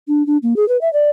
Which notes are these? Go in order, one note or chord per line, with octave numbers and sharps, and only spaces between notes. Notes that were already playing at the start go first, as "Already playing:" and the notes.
D4
D4
A#3
G#4
B4
E5
D5